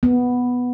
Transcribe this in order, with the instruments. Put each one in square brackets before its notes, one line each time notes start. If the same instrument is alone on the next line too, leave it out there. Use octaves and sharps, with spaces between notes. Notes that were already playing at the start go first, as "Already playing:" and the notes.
[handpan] B3